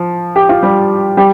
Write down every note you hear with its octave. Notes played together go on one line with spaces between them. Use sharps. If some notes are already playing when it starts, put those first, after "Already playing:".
Already playing: F3
G4
F4
G3 G4
G3 G4